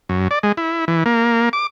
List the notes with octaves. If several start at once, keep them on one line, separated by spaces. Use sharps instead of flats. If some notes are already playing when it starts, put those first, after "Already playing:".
F#2
D5
G#3
E4
E3
A#3
D6